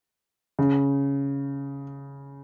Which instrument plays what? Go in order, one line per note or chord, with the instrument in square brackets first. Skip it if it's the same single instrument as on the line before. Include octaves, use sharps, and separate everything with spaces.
[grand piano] C#3